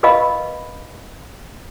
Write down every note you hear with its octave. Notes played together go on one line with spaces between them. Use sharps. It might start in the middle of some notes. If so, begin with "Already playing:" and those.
A#4 B4 D#5 F5 B5